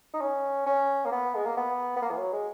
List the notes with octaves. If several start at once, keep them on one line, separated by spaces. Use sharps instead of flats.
D#4
C#4
C#4
A#3
B3
G#3
A#3
B3
B3
A#3
E3
F#3
G#3